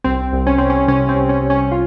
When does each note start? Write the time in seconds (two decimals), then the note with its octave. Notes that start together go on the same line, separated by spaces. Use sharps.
0.04 C2 C4
0.33 C2
0.47 C#4
0.58 C2 C4
0.70 C#4
0.88 C3 C#4
1.09 C4
1.16 C2
1.29 C#4
1.43 C2
1.50 C#4
1.72 F4